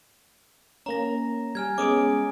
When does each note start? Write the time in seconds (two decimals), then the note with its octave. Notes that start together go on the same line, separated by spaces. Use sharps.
0.86 A#3 C#4 A#5 A#6
1.55 G3 G#5 F6 G#6
1.78 G#3 B3 C#4 D6 D#6 D7